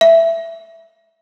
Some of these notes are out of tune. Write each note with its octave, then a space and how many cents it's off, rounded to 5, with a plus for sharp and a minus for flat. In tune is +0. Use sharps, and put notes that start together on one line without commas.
E5 +10